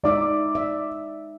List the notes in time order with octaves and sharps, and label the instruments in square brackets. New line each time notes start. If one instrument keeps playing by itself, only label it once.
[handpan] G#3 D#4 E5 [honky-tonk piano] D5 D6
[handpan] E5